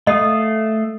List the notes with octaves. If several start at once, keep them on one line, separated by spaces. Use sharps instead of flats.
A3 D#5 F5 D#6